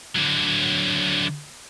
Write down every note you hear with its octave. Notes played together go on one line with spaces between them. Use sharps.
D3 F#3